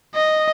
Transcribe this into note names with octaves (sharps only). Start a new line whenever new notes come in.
D#5